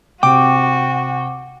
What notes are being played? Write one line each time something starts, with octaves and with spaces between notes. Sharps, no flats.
C3 F#4 G5 D6